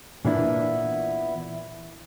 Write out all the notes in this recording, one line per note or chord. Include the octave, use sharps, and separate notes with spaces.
A#2 E3 A#3 B3 D4 E4